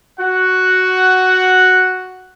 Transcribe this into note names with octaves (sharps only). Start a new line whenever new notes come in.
F#4 F#5